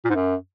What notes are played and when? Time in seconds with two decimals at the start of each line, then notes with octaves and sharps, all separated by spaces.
0.05 A#2
0.10 G#2
0.15 F#2